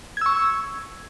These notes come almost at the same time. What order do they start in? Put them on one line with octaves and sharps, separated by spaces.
G#6 E6 C#6